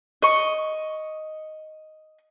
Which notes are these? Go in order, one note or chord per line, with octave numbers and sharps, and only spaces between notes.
D#5 C#6